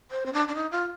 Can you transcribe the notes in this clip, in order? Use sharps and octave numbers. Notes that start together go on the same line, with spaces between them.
C5
C4
D4
D4
D#4
F4